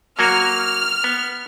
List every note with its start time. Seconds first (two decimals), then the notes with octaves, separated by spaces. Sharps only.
0.19 F#3 A#3 F#4 F6
1.04 B3